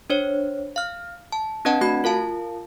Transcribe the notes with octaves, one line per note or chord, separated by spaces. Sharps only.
D4 C5 C#5
F5 F6
A5
C4 D4 B4 D#5 F#5 A5
A3 F#4 B5 G#6
F4 A#4 F5 A5